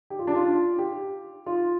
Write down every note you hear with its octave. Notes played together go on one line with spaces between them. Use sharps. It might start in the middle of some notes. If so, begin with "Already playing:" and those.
G4
F4
D4
F4
G4
F4